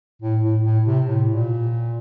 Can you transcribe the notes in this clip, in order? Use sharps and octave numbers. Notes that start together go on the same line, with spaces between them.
A2
A2
A2
C3
A2
A#2